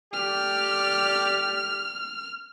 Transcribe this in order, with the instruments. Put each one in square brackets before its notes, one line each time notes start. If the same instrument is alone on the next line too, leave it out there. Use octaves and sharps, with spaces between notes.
[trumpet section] A3 G4 D5 [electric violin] F6